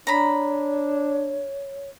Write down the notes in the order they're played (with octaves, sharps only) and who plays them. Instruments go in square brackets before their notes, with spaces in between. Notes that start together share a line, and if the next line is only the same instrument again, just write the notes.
[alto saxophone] D4 [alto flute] C#5 [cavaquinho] A#5 B5